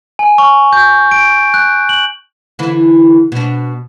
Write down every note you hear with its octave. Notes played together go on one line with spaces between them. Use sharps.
G#5
C#6
G6
D7
F#6
F#7
D3 E3 E4
B2 D4